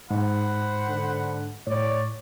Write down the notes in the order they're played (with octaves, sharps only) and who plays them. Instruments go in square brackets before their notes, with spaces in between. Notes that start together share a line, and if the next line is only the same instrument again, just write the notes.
[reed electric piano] G#2 [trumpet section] C5 F#5 B5
[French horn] D3
[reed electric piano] A2 [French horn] C#5 [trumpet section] D5